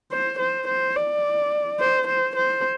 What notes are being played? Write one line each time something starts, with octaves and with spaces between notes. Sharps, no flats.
C5
C5
C5
D5
C5
C5
C5